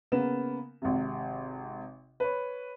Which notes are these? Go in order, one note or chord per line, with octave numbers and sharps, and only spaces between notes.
C#3 A#3 B3 A#4 E7
G#1 C3
B4 C#5